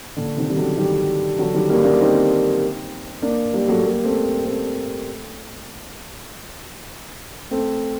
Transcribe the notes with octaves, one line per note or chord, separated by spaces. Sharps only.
A#2 D3
C3 D#3
G3
D3 F#3
D#3 G3
D3 F#3
D#3 G3
G3 A#3
A#3 D4
C4 D#4
A#3 D4
G3 A#3
F#3 A3
G3 A#3
A3 C4
A3 C4
A3 C4